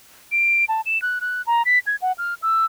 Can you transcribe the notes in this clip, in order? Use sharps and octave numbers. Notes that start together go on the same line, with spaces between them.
D7
A5
E7
F#6
F#6
A#5
B6
G#6
F#5
F6
E6